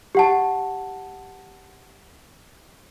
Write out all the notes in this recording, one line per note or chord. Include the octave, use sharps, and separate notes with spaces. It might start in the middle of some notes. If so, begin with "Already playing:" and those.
G4 F#5 A5